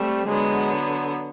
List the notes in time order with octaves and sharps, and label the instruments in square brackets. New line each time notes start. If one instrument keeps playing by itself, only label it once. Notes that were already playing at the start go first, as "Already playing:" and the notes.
Already playing: [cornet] G3 [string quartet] A3 C4
[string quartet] D3 F#3 B3 [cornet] G#3